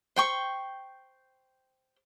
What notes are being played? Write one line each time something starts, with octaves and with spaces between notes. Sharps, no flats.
C5 G5 C#6